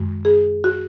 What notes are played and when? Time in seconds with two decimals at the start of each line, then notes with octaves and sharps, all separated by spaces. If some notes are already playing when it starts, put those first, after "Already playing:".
Already playing: F#2 D#3 G#3
0.25 G#4
0.64 F#4